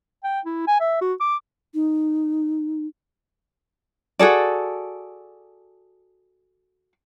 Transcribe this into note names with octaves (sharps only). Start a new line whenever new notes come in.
G5
E4
G#5
E5
F#4
D6
D#4
F#4 G#4 A4 D5